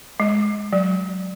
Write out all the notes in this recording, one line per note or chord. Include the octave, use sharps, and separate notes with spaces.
G#3
F#3